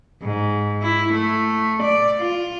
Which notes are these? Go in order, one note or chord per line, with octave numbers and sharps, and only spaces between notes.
G#2
E4
A3
D5
F4